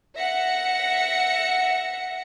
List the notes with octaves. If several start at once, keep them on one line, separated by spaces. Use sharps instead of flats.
E5 F#5 A#6 C#7